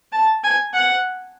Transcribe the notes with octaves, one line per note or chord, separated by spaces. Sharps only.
A5
G#5
F#5